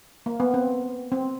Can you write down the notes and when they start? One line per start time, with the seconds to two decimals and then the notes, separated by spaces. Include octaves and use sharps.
0.26 A#3
0.40 B3
0.54 C4
1.12 C4